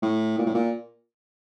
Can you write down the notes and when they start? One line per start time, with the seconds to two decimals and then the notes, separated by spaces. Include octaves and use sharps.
0.02 A2
0.38 A#2
0.46 A2
0.54 A#2